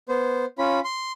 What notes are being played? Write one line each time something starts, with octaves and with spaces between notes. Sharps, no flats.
B3 C5
C#4 F4 B5
C6